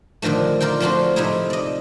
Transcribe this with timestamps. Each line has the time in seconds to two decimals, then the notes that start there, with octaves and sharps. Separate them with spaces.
0.22 A#2 D3 D#3 F3 A3
0.60 F4 A#4 D5 F5 G5
0.80 F3 A3 C4 D4 F4 F#4
1.16 A2 C3 F3 C4 D#4 E4
1.50 D5 D#5